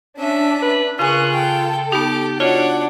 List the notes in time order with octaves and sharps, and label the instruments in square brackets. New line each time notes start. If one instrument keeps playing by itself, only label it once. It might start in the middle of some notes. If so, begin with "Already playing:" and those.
[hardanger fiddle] C#4 E5 [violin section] D4
[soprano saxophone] B4
[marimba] C#3 G#5 [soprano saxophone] F4 [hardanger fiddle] G#4 [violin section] A#4 C#6 F#6
[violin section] A4 [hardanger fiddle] G5
[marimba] B3 D#4 [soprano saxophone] G4 [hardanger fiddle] D6
[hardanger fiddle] D4 D6 [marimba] F4 F#4 D#5 [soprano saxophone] C#5 [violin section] F#5